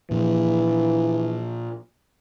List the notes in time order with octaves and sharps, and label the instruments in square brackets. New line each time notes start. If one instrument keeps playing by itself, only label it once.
[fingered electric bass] A#2 F3 [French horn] E3